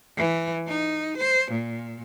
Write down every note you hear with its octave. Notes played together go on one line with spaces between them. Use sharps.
E3
D#4
C5
A#2